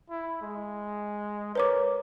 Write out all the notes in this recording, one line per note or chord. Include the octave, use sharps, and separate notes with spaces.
E4
G#3
A#4 B4 C#5 D6